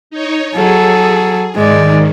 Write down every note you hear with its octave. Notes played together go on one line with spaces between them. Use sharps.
D#4 C#5
F#3 G#4 A4
G#2 D#3 G#3 D5